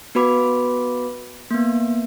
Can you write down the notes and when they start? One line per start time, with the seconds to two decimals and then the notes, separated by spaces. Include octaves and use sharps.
0.15 B3 F#4 B4 B5 D6
1.51 A#3 B3